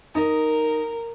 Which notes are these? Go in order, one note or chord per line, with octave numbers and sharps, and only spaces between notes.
D#4 A#4